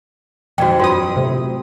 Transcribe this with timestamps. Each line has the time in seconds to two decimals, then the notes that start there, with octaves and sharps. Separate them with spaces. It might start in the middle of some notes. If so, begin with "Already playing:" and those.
0.58 F2 D#3 F#4 D5 G5
0.80 G2 F#3 F4 C6 D#6
1.16 A2 C3